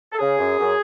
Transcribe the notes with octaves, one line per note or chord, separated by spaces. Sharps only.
A4
C#3 G#4
F#2
F#2